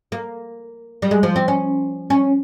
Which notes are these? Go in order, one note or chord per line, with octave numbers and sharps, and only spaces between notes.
A#3
G3
G#3
F3
C4
C#4
C#4